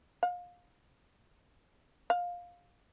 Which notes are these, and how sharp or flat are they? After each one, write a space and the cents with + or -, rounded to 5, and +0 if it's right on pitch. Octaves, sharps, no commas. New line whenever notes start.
F5 +25
F5 +15